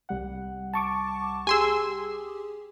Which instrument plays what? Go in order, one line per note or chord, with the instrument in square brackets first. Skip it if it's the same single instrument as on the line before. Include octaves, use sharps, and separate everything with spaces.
[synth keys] C2 G3 F#5
[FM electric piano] A5 C#6 D6
[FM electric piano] G4 G#4 [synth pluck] G#5 C6 E6